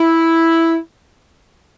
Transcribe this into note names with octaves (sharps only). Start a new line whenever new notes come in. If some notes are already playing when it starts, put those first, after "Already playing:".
Already playing: E4